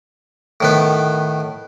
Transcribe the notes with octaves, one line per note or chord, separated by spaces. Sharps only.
A2 D#3 B3